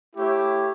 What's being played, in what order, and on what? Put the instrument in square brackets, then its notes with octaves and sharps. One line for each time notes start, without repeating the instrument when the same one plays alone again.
[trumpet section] A3 E4 G4 C#5 E5